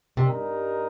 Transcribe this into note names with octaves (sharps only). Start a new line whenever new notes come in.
G2 C3 G3 D#4 A#4